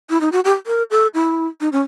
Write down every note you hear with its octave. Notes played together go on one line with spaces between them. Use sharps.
E4
D#4
F#4
G4
A#4
A4
E4
D#4
C#4